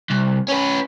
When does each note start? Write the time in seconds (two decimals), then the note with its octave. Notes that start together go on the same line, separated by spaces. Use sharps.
0.10 C2
0.49 C#4 B4